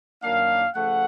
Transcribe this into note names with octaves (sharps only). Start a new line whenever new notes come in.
F#2 D#3 F#3 A#3 D4 F5
C#3 F3 A3 F#5